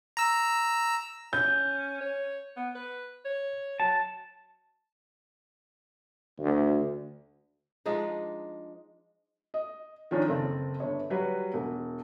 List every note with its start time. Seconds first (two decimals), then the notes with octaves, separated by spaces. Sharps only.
0.17 A#5 E6
1.33 C#4 G6
2.01 C#5
2.56 B3
2.75 B4
3.25 C#5
3.80 F#3 A5
6.39 D2
7.86 F3 G#3 D4 D#4
9.54 D#5
10.11 D#3 F3 C#4 D4
10.27 F#1 C4 A4
10.80 G1 C#5
11.10 F#3 G3 F#4 B4
11.54 E1